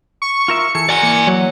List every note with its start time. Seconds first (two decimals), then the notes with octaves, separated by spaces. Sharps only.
0.22 C#6
0.48 F4 A#4 E5
0.75 E3 G#4 A4 C#7
0.89 F#4 A#4 D5 G#5
1.02 E3 A#3
1.27 F#3